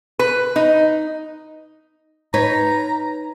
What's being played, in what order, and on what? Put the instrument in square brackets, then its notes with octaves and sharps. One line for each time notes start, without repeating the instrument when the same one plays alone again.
[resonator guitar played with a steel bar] B4
D#4
[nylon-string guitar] D#4 B4 C#5 [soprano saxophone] A#5